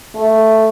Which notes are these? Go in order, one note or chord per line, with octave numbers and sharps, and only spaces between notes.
A3